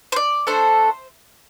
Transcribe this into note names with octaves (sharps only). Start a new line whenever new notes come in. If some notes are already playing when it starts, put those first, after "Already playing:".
C5
D5
A3 D4 A4 C5